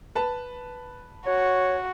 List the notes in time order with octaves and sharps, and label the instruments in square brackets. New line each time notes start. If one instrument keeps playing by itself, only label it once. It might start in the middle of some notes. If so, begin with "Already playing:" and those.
[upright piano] B4 A5
[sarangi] F#4 [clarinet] C#5